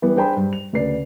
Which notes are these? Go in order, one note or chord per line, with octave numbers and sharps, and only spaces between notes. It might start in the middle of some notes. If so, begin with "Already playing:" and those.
E3 G3 B3 G4
D4 G#4 C5 G5 A5 B5
G2
F7
D2 C#3 B4 D5 C7